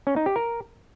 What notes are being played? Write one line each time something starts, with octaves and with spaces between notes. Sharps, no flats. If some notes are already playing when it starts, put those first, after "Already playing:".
C#4
D#4
G4
A#4